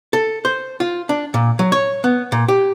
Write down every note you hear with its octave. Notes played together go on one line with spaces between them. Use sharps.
A4
C5
F4
D4
A#2
F#3
C#5
B3
A#2
G4